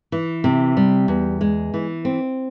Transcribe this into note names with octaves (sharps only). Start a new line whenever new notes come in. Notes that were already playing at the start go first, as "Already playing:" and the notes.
E3
C3
G3
E2
G#3
E3
C4